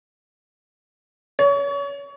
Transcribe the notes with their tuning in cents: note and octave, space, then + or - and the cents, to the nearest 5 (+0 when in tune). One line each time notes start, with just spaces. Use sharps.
C#5 +30